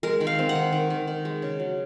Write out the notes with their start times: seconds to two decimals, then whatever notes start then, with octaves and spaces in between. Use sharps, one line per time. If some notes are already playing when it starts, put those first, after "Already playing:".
0.03 G#3 A#4
0.20 D#3
0.27 F5
0.39 C4
0.49 F#5
0.55 D#3
0.72 D#3
0.90 D#3
1.07 D#3
1.25 G#3
1.42 C#3
1.60 F#3